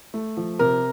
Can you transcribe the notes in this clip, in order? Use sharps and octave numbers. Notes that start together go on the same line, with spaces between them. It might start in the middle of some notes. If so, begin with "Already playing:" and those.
A3
F3
C3 A#4